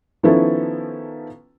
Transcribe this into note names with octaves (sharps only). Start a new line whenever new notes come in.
D#3 F3 B3 C#4 E4 A4